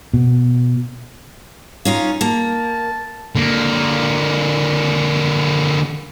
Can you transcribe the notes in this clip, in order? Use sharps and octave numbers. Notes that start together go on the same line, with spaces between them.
B2
C#4 D#4 F4 F5
A#3 A5
D3 A#3